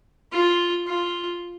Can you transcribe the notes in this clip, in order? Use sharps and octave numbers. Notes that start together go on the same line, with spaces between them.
F4
F4